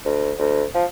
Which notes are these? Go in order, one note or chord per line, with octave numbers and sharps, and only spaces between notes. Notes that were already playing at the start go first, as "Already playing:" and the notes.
D2
D2
F3